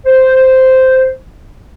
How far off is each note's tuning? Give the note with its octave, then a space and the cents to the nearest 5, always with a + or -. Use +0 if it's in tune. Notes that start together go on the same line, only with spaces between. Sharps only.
C5 -5